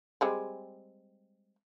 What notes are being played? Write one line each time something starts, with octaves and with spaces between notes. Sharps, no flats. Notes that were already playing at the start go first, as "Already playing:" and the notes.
G3 G#3 C4